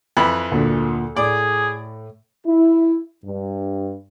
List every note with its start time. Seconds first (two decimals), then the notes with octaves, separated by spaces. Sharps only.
0.17 F2 E3 B5
0.51 D2 A#2
1.16 A2 G#4 D5
2.47 E4
3.25 G2